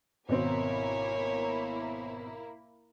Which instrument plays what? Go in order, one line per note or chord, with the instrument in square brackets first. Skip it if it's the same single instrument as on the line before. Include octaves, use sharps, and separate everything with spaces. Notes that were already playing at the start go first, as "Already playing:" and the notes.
[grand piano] G#1 B2 C4 [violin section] A#3 E4 [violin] C#5 G#5